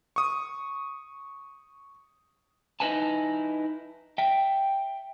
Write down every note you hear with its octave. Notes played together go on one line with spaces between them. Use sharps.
C#6 D#6
D#4 E4 B4 G#5 A5
E5 G5